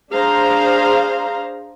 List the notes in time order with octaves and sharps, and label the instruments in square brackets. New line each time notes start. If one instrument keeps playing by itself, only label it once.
[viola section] D4 G#4 C5 F5 A#5